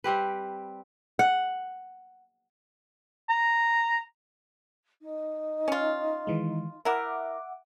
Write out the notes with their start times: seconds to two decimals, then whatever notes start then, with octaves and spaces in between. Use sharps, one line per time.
0.04 G3 C4 G4 B4
1.19 F#5
3.29 A#5
5.01 D#4
5.68 C#4 F4
6.27 D#3 E3 G#3
6.85 E4 A#4 E5 F#5 D6